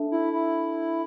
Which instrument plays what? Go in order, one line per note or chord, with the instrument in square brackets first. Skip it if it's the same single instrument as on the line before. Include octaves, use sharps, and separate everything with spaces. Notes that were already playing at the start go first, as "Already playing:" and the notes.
Already playing: [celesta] D4 A4 E5 A5
[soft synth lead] E4
E4